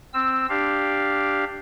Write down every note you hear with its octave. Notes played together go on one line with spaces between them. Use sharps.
C4 E6
D4 G4 F5